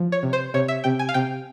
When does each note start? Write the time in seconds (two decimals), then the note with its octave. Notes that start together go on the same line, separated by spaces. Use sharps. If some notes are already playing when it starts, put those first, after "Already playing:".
Already playing: F3
0.12 C#5
0.23 C3
0.33 C5
0.54 C3 C#5
0.68 E5
0.84 C3 G5
0.99 G#5
1.09 F5
1.14 C3 G5